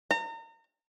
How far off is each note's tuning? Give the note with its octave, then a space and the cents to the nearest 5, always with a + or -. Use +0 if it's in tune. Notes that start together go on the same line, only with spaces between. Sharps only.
A#5 -35